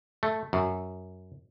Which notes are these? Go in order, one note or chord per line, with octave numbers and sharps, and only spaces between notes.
A3
F#2